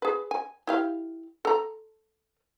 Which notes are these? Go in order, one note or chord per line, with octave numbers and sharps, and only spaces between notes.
G#4 B4
G#5
E4 G4 F5
A4 A#5